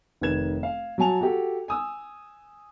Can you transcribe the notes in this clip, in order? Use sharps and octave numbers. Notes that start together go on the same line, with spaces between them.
F1 D#3 B4 G#6 E7
F5
F#3 F#4 G#5 A5 F7
F#4 G4 A4
G#5 D#6 E6